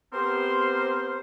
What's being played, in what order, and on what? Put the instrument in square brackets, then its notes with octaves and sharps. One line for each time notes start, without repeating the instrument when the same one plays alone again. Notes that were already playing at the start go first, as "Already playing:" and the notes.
[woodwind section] B3 C4 G4 A#4 C5